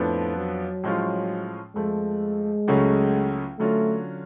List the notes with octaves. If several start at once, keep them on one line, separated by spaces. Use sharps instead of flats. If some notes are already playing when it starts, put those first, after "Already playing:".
Already playing: F2 A2 F3 B3 D4
F#3
A2 F3 G#3 C#4 F4
F2 F3 G#3 A3
C#2 C#3 F#3 A3 C#4
D3 F#3 A3 C#4 F4